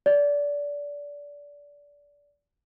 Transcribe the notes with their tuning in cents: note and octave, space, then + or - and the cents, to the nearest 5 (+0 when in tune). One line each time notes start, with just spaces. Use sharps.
D5 -20